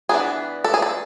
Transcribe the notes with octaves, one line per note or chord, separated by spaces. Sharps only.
E3 B3 D4 G#4
A4
G#4
A4